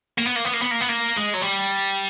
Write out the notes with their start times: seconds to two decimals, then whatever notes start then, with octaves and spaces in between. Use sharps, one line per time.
0.18 A#3
0.27 B3
0.36 A#3
0.45 B3
0.54 A#3
0.62 B3
0.71 A#3
0.80 B3
0.89 A#3
1.17 G#3
1.34 F#3
1.42 G3